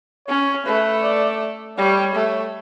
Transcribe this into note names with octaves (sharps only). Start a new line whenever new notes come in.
C#4 C#5
A3 B4
D5
G3 C#5
A3